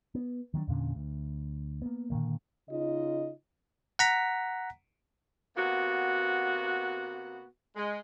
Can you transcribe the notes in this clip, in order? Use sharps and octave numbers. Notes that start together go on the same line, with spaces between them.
B3
D#3 F#3 A#3 D4
E2 A#2 D3 C#4
D2
A#3 B3
A#2 D3 D#3 A#3
C#3 D#4 F4 D#5
F#5 A#5 B6
C3 A#3 B3 F#4
G#3